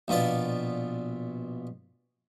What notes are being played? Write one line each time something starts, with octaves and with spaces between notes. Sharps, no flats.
A#1 B2 F4 D5